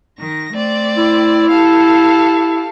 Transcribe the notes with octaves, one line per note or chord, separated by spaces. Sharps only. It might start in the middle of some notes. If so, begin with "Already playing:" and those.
D#3 A#6
A3 C4 D5
E4
G4 A4 F5